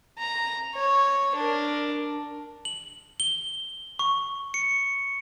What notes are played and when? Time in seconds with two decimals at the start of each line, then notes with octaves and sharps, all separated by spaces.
0.19 A#5
0.75 C#5
1.35 D4 A#4
2.65 F#7
3.20 G7
3.99 C#6
4.54 C#7